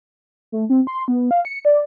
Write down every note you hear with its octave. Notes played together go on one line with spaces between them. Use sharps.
A3
C4
C6
B3
F5
C#7
D5